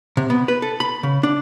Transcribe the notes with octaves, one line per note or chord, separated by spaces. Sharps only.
C3
B3
B4
A4
B5
C#3
D4